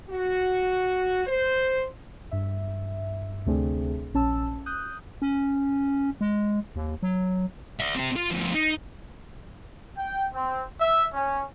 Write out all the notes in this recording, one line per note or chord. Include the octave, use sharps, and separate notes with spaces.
F#4
C5
G2 E5
D2 C3 A3 C4 D4 G#4
A#1 C#4 A5 E6
D#6 F#6 G6
C#4
G#3
D#2
F#3
D5 E5
C4 G4
F4
D2 F3
D#4
G5
C4
E5
C#4